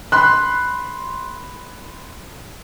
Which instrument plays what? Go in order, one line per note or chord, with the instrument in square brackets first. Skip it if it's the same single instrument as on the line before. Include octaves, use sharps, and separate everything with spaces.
[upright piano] B5 C6 F#6